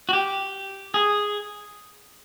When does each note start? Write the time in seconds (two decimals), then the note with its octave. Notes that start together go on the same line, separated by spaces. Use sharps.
0.09 F#4
0.13 G4
0.94 G#4